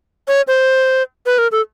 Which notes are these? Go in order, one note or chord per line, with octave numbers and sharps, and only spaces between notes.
C#5
C5
B4
A#4
A4